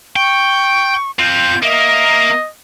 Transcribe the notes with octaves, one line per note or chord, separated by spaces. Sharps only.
G5 C#6
C4 F4 G6
A#3 A#4 D#5 E5